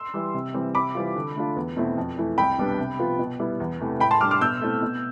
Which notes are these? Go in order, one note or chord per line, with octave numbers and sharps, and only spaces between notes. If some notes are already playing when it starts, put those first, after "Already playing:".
Already playing: C6 E6
E3 G3
C3
E3 G3 C4
C3 B5 D6
E3 G3 C4 F4
D3
A3 D4 F4
E2
B2 A3 C4 E4
F2
E3 A3 E4
C2 G5 B5
B2 G3 B3 D4
C3
F3 B3 F4
B2
G3 B3 E4
E2
C3 E3 A3
A2 G5 B5
A5 C6
G3 D4 D6 F6
D6 F6
B2 E6 G6
A3 C4 E4
B2